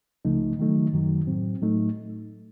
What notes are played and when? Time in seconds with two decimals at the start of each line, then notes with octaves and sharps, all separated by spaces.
0.25 C#2 C#3 F3 A3 D#4
0.59 D#3 F#3 A3 D#4
0.93 F#2 D#3 F#3
1.27 A2 F#3 C4
1.61 A2 F#3 A3 D#4